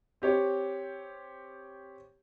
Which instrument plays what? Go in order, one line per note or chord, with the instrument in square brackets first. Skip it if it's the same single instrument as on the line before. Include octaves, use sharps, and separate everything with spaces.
[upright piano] C4 G4 C#5